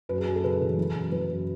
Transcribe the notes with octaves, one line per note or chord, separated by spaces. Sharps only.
F#2 B4
G#4
F#2
A4
C#3 B4
E3
E3
F#2
E3 B4
F#2